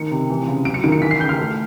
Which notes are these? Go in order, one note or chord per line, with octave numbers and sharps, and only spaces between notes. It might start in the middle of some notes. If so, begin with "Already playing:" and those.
Already playing: D#3 C#7
C3
E3
C#3
F#3 D7
C#7
D#3 D7
C#7
E3 B6
C7
C#3 G6
F6
A3